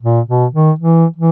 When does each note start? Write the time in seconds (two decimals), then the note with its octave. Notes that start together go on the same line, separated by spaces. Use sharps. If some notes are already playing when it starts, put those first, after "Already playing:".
0.03 A#2
0.28 B2
0.54 D#3
0.79 E3
1.16 E3